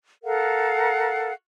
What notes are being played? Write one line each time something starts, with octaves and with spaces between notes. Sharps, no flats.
A4 A#4 F5 F#5